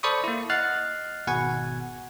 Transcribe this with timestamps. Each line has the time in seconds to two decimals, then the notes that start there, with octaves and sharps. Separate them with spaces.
0.03 A4 C5 D5 B5 C#6 D#6
0.24 A#3 E4
0.50 D#5 F#5 F6 F#6 A6 C7
1.27 G#1 B2 F#5 G#5 G#6